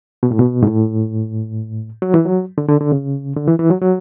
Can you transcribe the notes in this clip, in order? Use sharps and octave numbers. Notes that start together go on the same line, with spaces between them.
B2
A2
B2
G#2
A2
F#3
E3
F#3
D3
D3
D3
C#3
D3
E3
E3
F#3
F#3